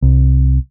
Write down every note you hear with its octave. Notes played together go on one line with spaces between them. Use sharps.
C2